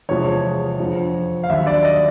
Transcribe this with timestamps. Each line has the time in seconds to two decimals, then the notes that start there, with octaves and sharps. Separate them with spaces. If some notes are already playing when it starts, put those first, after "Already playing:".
0.09 E2 C3 F3 G#3 C#5
0.80 F2 D3 F3
1.44 F5
1.49 D#2 D3 F#3 E5
1.67 D5
1.84 D#5